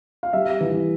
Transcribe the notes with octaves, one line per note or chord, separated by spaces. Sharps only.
F5
G3 E5
E3